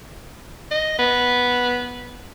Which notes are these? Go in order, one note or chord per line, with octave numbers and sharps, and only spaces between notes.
D#5
B3